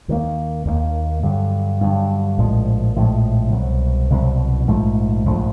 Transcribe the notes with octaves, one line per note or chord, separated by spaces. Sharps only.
D#2 D#3 G3 A#3
D#2 D#3 G3 A#3
G2 D3 F#3
G2 D3 F#3
A#1 A2 F3 G#3
A#1 A2 F3 G#3
C2 B2 F#3
C2 B2 F#3
A#1 G#2 F3 A3
A#1 G#2 F3 A3